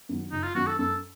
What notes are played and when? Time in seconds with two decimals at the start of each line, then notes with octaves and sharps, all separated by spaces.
0.09 F#2 D#3 F#3
0.32 F#1 D#4
0.43 F4
0.55 F#2 D#3 F#3 F#4
0.67 A4
0.79 F#2 A4